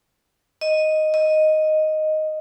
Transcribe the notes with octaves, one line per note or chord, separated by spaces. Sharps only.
D#5
D#5